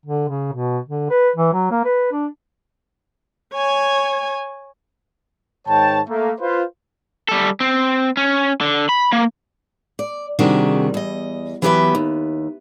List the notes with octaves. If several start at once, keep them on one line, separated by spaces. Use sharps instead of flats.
D3
C#3
B2
D3
B4
E3
F#3
A#3
B4
D4
C#5 G#5
G#2 D#3 C#5 G5 A5
A3 A#3
F4 B4 C5
G3 A4
C4
C#4
D3
B5
A#3
D5
C3 D#3 G3 D4 F#4 G#4
E2 D#5
E3 F#3 B3 G4 B4 E5
D#2